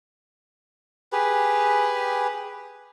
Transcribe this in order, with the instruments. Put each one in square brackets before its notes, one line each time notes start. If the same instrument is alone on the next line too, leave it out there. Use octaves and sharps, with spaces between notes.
[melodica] G4 G#4 B4